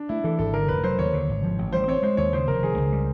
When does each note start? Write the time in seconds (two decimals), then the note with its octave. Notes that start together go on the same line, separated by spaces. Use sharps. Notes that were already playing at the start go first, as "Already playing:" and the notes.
Already playing: D4
0.09 A3 E4
0.24 E3 A4
0.39 G#1 A4
0.53 D3 A#4
0.68 F1 B4
0.84 F#3 C5
0.98 D#2 C#5
1.13 D3
1.29 G#1
1.43 F3
1.58 A1
1.73 G3 C5
1.88 C4 C#5
2.03 G#3 C5
2.17 D#2 C#5
2.33 C#3 C5
2.48 F1 A#4
2.63 D#3 G#4
2.78 C#2
2.92 G3